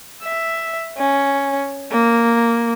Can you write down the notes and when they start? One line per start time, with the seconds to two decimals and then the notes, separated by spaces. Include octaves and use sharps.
0.23 E5
0.97 C#4
1.92 A#3